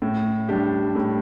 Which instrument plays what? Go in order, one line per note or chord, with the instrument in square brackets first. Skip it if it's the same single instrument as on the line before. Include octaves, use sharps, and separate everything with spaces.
[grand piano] A2
G3 D4 G4
A2